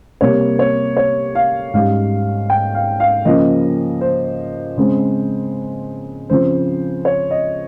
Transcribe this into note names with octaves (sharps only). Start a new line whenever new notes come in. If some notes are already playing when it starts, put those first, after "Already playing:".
C3 G3 A#3 C#5
C#5
C#5
F5
G#2 G3 C#4 F5
G5
F5
F5
C#3 F3 A#3 C#4 D#5
C5
C#3 G#3 C4
C#3 F3 C4 C5
C#5
D#5